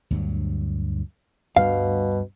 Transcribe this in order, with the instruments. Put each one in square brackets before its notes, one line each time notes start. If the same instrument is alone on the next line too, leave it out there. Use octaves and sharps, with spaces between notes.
[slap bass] D2 G2 F#3
[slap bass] D2 G2 G3 [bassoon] B2 [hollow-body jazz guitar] F5